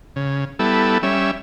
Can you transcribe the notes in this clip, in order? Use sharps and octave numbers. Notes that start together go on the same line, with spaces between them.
C#3
G3 B3 E4 A4
G3 C#4 E5